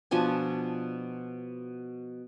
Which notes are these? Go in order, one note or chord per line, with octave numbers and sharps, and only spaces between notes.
B2 F3 D4 G#5